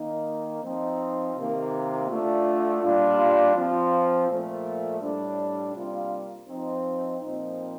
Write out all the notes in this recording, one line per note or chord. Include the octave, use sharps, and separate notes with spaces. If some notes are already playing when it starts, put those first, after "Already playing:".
Already playing: D#3 A#3 D#4
F3 C4 D#4
C3 D#3 A#3
D3 A3 D4 F4
A#2 G3 D4 F4
F3 C4 F4
A#2 F3 A3
A2 G3 D4
C3 G3 A#3 D4 F4
F3 C4 D#4
A#2 F3 C4 D#4